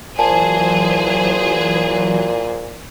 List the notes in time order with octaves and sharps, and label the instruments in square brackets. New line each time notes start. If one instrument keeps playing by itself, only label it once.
[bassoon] A#2 [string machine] E3 F#3 [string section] G#4 C5 [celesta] G#5 A5